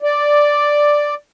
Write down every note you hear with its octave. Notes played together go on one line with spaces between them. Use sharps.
D5